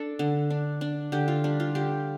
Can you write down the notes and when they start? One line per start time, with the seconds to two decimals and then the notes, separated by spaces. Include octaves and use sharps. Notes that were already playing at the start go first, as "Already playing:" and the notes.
Already playing: D4 A4
0.19 D3
0.50 D4
0.81 D4
1.12 D3 G4
1.28 F4
1.44 G3 D4
1.60 F4
1.75 D3 G4